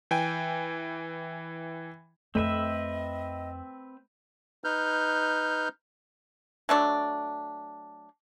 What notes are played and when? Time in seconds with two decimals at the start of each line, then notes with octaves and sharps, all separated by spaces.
0.11 E3 G5 G#5
2.35 F2 A3 C4 D#4 B4 D#5 E5
4.64 D#4 B4 F6 G6
6.69 F#3 A3 D4